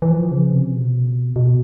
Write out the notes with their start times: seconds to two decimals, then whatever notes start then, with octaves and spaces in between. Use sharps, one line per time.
0.02 E3
0.11 F3
0.31 C#3
0.53 C3
0.73 B2
1.36 B2